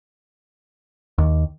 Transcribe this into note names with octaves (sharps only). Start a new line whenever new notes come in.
D#2